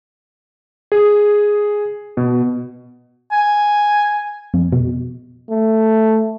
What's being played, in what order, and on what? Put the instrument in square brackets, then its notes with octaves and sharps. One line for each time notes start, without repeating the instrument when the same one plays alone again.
[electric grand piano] G#4
B2
[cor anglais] G#5
[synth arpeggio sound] F2
B2
[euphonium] A3